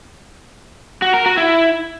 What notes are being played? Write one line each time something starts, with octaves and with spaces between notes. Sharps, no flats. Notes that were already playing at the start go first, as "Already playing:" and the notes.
F#4
A#4
F#4
E4